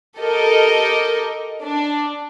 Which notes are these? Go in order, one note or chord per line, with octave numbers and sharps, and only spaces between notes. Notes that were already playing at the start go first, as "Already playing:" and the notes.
G4 A4 A#4 D#5
D4